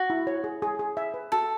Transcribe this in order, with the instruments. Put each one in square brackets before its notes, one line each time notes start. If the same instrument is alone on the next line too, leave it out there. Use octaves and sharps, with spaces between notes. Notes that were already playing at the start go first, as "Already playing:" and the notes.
Already playing: [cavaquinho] F#4
[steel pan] E4
C#5
G#4
G#4
G#4
E5
B4
[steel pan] F#4 [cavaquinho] A4